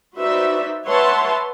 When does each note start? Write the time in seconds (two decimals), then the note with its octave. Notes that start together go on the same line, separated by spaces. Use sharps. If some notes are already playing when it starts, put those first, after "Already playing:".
0.17 D#4 F#4 B4 C5 D5 E5
0.86 B4 C#5 E5 F#5 A5 C6